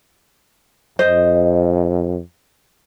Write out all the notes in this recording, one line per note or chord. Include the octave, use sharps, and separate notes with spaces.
F2 C5 D#5